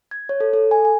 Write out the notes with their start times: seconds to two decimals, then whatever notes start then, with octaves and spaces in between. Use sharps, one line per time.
0.11 G#6
0.29 C#5
0.40 A4
0.53 A4
0.71 G#5
0.85 G#5